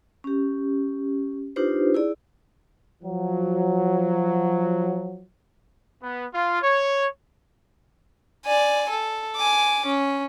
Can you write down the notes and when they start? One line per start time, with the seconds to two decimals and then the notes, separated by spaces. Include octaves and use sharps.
0.24 C#4 G4
1.56 D4 D#4 F4 G4 B4 C5
1.94 E4 G#4 D5
3.04 F3 F#3
6.01 B3
6.33 F4
6.62 C#5
8.46 D5 G#5
8.90 A4
9.36 G#5 D6
9.86 C#4